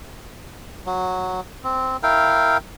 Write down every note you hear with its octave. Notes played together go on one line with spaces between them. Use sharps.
F#3
C4
E4 A#4 F5 G5